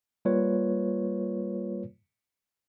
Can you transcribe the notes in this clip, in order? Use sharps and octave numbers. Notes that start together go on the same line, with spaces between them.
G3 A#3 F4 B4 C#5